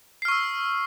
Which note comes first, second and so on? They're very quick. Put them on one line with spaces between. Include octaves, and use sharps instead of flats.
C7 F6 C#6 E6